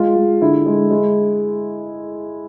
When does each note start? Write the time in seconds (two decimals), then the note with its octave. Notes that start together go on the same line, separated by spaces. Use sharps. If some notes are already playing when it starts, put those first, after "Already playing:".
Already playing: G#3 F4
0.16 G#3
0.41 D3 E4
0.66 G#3
0.91 G#3